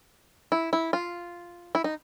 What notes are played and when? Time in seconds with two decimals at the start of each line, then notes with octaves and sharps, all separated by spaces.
0.52 E4
0.73 E4
0.93 F4
1.75 E4
1.84 D#4